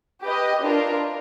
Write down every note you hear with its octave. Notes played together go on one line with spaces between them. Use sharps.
G4 B4 D#5
D4 F4 A#4